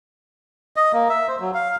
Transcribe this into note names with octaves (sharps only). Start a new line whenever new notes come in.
D#5
A#3
E5
C5
F#3
F5